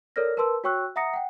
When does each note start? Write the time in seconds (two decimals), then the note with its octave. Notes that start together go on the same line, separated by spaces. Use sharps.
0.16 A4 A#4 C#5 D5 F6 A#6
0.37 A#4 B4 A5 C6 E6
0.64 F#4 C#5 G5 C#6 E6 F#6
0.96 E5 F#5 A#5 D#6 A#6 C#7
1.14 F#5 G5